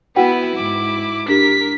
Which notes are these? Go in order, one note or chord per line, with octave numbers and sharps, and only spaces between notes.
B3 E4 F#4 B4 F#5 G5
G#2 D6
D4 G4 A#4 B6